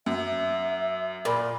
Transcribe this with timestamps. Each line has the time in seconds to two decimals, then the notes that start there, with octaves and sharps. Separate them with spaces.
0.06 F#2 E5
1.25 A#2 A#4 B5 D6